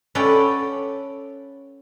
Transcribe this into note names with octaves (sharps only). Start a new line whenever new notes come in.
C#4 A4 B4 D5 F#5 G5